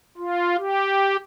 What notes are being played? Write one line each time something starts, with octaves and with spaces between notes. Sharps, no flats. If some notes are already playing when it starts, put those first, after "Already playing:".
F4
G4